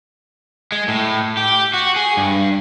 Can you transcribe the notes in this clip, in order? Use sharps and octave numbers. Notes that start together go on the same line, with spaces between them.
G#3
A2
G4
F#4
G#4
G2